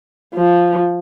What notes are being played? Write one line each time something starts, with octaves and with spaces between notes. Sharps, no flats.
F3